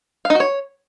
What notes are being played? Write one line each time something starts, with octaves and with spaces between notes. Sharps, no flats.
F5
D#4
F#4
C#5